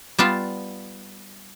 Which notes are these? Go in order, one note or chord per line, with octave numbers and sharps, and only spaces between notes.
G3 B3 F4 A5